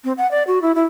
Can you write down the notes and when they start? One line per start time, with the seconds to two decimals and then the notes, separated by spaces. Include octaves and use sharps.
0.04 C4
0.18 F#5
0.31 D5
0.47 F#4
0.62 E4
0.75 E4